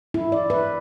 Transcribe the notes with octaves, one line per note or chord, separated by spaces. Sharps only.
E4
D5
B4